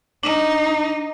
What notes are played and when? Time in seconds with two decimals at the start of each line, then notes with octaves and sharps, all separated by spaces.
0.23 D4 D#4